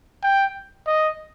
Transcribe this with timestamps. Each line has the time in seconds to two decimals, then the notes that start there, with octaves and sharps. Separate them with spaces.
0.23 G5
0.87 D#5